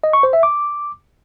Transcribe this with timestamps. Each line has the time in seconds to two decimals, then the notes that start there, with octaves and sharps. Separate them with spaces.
0.04 D#5
0.13 C#6
0.23 C5
0.33 E5
0.43 D6